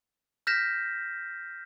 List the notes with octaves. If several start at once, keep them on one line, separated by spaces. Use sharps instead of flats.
F6 G6 A#6 B6 E7